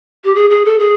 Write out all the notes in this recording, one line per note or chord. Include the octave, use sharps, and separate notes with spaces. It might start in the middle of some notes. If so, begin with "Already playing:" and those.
G4
G#4
G#4
A4
G#4